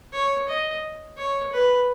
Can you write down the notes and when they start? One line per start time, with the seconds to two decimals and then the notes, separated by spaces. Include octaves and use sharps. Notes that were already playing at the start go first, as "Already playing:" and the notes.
0.13 C#5
0.48 D#5
1.17 C#5
1.52 B4